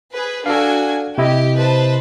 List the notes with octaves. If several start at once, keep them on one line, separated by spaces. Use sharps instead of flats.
G#4 B4
D4 F#4 A4 F5 G#5
C3 E4 G4 D#5
B4 C5 A5